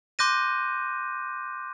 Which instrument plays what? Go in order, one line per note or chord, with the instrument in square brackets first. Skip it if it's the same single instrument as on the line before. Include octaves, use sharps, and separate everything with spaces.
[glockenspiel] C6 D6 F#6 G6 A#6 D#7